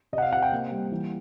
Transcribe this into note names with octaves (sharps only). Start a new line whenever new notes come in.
C3 D#5
F#5
F5
C3 F#5
G5
A#3
G3
E3